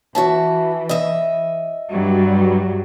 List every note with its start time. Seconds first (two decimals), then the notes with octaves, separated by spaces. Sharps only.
0.15 E3 F#4 E5 A5
0.89 D#5 E5
1.90 G2 F#3 G3